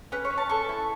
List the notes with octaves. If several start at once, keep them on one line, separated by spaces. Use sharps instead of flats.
C#4 B4
C#5
C#4
A5
A4 C#6
E4